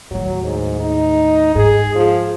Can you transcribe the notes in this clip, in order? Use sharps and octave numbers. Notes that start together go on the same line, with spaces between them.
D#2 A2 F#3
G#2
D#4
G#2 G#4
F3